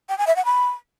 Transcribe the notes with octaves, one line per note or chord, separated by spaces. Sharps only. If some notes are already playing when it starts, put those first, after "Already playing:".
G5
G#5
E5
F#5
B5